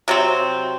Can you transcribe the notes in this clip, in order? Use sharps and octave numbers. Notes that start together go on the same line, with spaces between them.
C3 F#3 C4